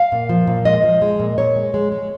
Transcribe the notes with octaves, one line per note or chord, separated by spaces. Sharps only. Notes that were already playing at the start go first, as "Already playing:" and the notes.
Already playing: F5
A#2
F3
A#2
G#3 D#5
F3
G#3
A#2
A#2 C#5
G#3
G#3
G#3